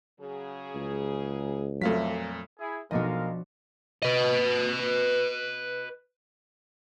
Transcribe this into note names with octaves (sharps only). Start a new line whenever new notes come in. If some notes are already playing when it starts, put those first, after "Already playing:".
C#3 F#3 G#4
C#2
F2 A#2 F#3 A3 F5 B6
E4 G#4
B1 F3 G#3 D4 F#4 A#4 D#5 F5
B4 D#5